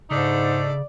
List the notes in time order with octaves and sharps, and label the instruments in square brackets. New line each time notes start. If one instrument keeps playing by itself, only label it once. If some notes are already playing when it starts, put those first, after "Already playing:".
[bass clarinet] G#2 [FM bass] C#3 [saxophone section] A3 D4 D#4 [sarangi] D5